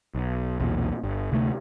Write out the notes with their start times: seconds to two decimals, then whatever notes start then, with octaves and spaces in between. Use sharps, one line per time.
0.15 B1
0.60 B1 E2 A#2
1.03 G1
1.31 D2 C3 A3